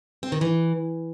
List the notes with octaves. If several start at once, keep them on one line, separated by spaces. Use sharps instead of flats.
C4
D#3
E3